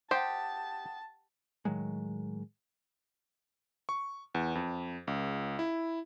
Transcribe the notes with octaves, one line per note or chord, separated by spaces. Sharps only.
G4 C5 F#5 G5 A5 D#6
A2 D#3 F#3 G#3
C#6
E2
F2
C#2
E4